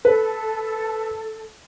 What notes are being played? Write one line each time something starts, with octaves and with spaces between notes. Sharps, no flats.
A4 B4